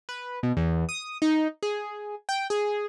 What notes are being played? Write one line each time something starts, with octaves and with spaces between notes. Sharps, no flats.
B4
B2
E2
D#6
D#4
G#4
G5
G#4